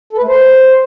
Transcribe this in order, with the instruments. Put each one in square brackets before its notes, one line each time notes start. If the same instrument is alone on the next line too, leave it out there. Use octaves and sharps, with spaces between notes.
[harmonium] A4
B4
A3
C5